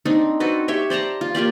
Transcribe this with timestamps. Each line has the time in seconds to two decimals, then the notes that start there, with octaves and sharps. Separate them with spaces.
0.05 C4 D4 D#4
0.40 C4 F#4 A4 B4
0.68 G4 C#5 E5
0.90 C5 D5 A5 A#5
1.21 F4
1.35 A#3 F4 G4 D5